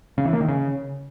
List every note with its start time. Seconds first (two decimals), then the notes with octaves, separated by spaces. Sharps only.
0.18 C#3
0.25 E3
0.33 A#3
0.41 D#3
0.48 C#3